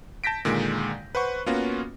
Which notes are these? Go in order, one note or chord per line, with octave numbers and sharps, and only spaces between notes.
A5 G6 A#6 B6 D7
A#2 D3 D#3 G#3
B4 C5 F#5 C#6
A#3 B3 C#4 F4 F#4